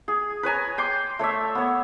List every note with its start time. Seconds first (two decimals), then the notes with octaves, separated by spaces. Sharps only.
0.08 G#4
0.43 B4 C#5 G#5 A#5
0.78 G5 C6 D6
1.19 A3 C#5 D5 E5
1.55 B3 C#5